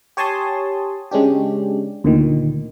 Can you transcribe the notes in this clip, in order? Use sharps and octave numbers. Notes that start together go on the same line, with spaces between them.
G4 C#5 G#5 A5 C6 D#6
C#3 G#3 C#4 D4 G4
D2 A#2 D#3